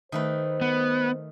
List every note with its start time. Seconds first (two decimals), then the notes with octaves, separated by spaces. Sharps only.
0.12 D#3 A3 B4 C5
0.61 B3